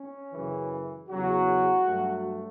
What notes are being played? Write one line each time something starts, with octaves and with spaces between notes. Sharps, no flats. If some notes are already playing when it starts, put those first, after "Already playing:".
Already playing: C#4
F#2 C#3 E3
E2 C#3 F#3 F#4
G2 F#3 A3